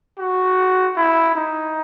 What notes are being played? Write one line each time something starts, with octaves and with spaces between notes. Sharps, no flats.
F#4
E4
D#4